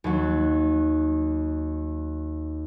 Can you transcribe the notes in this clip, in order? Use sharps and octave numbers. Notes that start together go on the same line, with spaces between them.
D#2 F#3